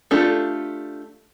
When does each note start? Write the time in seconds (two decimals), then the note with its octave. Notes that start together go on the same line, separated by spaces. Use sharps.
0.11 A3 D4 F4 G4 A4